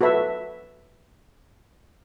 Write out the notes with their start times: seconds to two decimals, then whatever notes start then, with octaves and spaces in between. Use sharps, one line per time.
0.01 F#4 A4 B4 E5